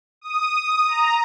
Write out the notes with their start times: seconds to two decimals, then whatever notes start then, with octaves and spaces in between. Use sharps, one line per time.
0.21 D#6
0.88 A#5